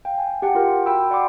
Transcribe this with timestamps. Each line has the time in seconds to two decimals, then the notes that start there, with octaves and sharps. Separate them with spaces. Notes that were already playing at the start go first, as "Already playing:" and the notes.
0.05 F5 G5
0.18 G#5
0.42 G4 F#5 G5 A5
0.55 F4 A#4
0.86 F#4 G5 B5 E6
1.11 D5 F#5 G5 B5 C6 D6